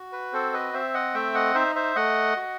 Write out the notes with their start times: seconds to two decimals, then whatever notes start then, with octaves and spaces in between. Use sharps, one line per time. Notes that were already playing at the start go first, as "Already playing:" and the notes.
Already playing: F#4
0.12 B4
0.33 C4 A4 C5
0.53 B4 D#5
0.73 C4 C5 E5
0.94 D#5 F#5
1.14 A3 E5 G5
1.35 D#5 F#5
1.55 D#4 C5 E5
1.75 C5 E5
1.96 A3 D#5 F#5
2.36 F#4